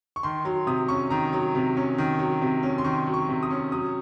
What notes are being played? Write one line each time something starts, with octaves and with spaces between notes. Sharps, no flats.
C#6
D#3 C6
F#3 C6
C3 D#6
C#4 C#6
D#3 A#5
F#3
C3
C#4
D#3
F#3
C3
C#4
C6
D#3 C#6
F#3
C#6
C3
D#6
C#4
F#3 D#6